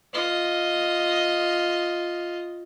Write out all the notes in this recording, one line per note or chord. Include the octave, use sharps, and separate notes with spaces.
F4 D#5